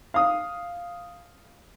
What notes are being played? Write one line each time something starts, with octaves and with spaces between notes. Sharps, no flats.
F5 D#6